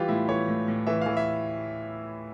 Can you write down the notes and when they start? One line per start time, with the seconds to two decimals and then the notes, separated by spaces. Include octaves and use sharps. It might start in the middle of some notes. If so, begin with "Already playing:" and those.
Already playing: E3 G3 F4 G4
0.08 A2 E4
0.29 E3 C#5
0.48 A2
0.68 A2
0.87 E3 E5
1.01 F5
1.06 E3
1.17 E5